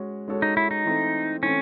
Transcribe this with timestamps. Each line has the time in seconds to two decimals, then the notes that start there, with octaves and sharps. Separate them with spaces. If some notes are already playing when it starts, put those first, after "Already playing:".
Already playing: G#3 C#4 F#4 C#5
0.28 G#3 C#4 F#4 A4 C#5
0.42 D#4
0.57 E4
0.71 D#4
0.85 E3 A3 C4
1.43 E3 A3 C4 C#4